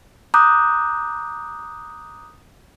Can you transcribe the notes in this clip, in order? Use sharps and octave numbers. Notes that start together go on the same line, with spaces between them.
A#5 D6 D#6 F#6 G6